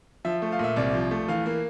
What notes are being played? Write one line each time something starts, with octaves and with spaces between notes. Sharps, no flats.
F3 E5
A3
F5
A#2 E5
C2 D5
F3
A3
E3 F5
A#3